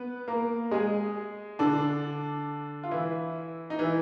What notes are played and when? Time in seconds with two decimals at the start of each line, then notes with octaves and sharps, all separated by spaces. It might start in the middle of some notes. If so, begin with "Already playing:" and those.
Already playing: B3 B4
0.28 A#3 A#4
0.71 G#3 G#4
1.59 D3 D4
2.84 F4
2.91 E3 E4
3.70 D#4
3.79 E3 E4